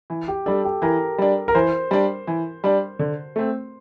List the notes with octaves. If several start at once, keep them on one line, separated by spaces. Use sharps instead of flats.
E3
G4
G3 D4 A4
G4
E3 A#4
G3 D4
A#4
E3 C5
G3 D4
E3
G3 D4
D3
A3 C4